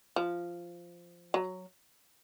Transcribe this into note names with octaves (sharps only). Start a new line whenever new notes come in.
F3
F#3